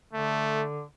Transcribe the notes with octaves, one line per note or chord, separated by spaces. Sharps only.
D3 A3